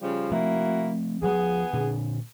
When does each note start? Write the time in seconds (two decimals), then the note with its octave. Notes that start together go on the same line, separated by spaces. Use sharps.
0.01 C#3 F3 G3
0.31 F3 A3 A#3 C4 E4 F#4
1.22 D2 D#3 F3 B3 G#4
1.73 A#2 D3 D4